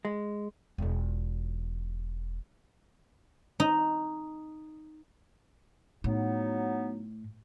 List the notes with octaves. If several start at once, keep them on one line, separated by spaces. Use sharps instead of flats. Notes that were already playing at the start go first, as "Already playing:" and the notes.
G#3
E1 F4
D#4
A2 F#3 B3 D#4